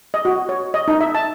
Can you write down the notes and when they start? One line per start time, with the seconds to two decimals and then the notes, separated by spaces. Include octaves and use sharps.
0.14 D#5
0.25 F#4
0.49 C#5
0.74 D#5
0.88 D#4
1.01 E5
1.15 A5